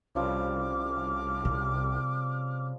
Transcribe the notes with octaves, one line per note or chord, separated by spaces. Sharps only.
C2 C#3 F3 G3 D6 F6
C3